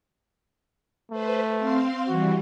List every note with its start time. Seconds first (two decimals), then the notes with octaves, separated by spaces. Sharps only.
1.11 A3 B4 C5
1.57 C4 F5 C6
2.08 E3 G3 F#4